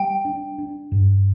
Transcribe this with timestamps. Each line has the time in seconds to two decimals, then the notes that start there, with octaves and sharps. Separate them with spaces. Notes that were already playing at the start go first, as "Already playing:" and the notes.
Already playing: G3 G5
0.25 D4
0.58 D4
0.92 G2